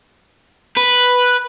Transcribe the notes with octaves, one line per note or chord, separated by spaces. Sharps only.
B4